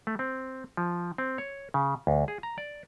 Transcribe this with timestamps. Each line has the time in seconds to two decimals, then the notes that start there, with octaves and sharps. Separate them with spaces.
0.07 A3
0.19 C4
0.77 F3
1.18 C4
1.38 C#5
1.74 C#3
2.07 D2
2.28 G#4
2.43 A#5
2.58 D5